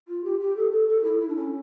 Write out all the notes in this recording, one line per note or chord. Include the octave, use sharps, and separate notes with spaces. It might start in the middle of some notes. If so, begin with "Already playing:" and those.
F4
G4
G4
A4
A4
A4
E4
E4
D4
C#4